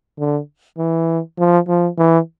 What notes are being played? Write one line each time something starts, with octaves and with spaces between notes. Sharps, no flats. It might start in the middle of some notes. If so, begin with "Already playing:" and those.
D3
E3
F3
F3
E3